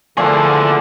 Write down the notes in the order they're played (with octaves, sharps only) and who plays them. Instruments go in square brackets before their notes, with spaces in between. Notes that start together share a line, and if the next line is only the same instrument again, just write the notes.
[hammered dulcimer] A#2 F3 [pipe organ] D3 [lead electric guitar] E4 G#4